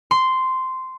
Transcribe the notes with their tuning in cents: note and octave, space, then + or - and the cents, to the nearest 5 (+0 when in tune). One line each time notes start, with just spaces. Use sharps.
C6 -10